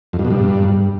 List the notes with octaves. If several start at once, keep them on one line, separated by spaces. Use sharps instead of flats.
F2
G2
B2
G2